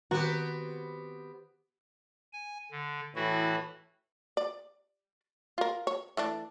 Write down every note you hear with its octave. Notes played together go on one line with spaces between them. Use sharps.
D#3 B3 C4 F#4 G4
G#5
D3
A2 E3 E4 F#4
D5
F4 A#4
C#5
E3 A3 D4